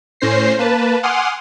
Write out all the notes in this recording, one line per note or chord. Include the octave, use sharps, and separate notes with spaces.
A2 C#4 C5 A#6 C7
A#3 B4 A5
F#5 G#5 C6 D6 D#6 F6